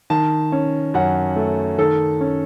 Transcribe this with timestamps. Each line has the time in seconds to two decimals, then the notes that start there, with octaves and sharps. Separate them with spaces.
0.10 D#3 A5
0.52 C#4
0.94 F#2 F#5
1.36 A3
1.78 D#3 A4
2.21 C#4